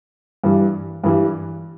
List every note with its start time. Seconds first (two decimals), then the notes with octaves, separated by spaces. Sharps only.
0.43 G2 E3 G3
1.04 G2 E3 G3